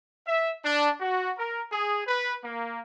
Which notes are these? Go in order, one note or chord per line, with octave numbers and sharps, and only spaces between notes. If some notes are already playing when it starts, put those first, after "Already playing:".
E5
D4
F#4
A#4
G#4
B4
A#3